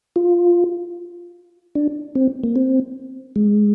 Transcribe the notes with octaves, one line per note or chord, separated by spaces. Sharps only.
F4
D4
C4
A#3
C4
G#3